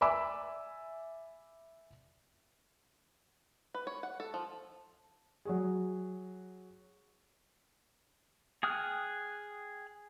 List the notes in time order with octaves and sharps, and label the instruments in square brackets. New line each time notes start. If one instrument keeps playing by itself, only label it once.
[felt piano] D5 E5 G#5 B5 D6 E6
[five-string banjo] B4
C#5
F#5
A4
F3
[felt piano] F#3 F#4 G#4
[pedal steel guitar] G#4 G5 D#6 F6 F#6